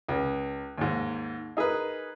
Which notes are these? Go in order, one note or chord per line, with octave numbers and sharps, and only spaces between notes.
C#2
D#2 G#2
D#4 G#4 A#4 B4